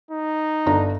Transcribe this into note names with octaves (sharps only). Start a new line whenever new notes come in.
D#4
G1 D4 A#5